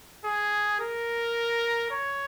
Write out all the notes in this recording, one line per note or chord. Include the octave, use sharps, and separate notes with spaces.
G#4
A#4
C#5